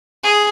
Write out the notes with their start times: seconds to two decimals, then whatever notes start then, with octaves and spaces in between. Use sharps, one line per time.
0.23 G#4